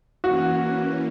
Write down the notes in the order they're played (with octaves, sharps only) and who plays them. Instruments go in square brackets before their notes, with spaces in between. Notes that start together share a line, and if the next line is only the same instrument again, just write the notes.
[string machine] E3 A#3 C#4 [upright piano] F#4